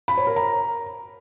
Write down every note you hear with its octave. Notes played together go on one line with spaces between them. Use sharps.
B5
C#5
A#4
A#5